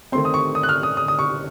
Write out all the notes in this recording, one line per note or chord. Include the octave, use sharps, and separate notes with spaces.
D#3 A3 C4 C6
D#6
C#6
D#6
F#6
F6
D#6
D#6
D#6
C#6